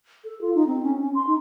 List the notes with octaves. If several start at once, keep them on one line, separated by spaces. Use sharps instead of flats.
A4
F4
D#4
C4
C#4
C#4
C6
D#4